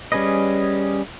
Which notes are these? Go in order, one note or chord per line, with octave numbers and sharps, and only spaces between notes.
G3 C#4 G#4 B4 D#5